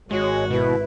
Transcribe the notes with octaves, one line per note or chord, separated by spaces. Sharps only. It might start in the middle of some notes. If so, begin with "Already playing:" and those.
G#1 G#3 F#4 C#5
B2 E4 B4